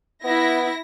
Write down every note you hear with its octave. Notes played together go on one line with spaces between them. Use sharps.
B3 E4 A#6